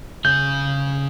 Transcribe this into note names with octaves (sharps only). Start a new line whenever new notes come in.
C#3 G#4 G6